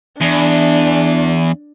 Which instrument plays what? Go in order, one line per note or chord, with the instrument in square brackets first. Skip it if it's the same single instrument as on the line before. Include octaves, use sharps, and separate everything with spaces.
[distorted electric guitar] E2 [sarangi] D4